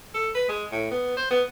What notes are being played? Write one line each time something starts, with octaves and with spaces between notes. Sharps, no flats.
A4
B4
G#3
A2
B3
C5
B3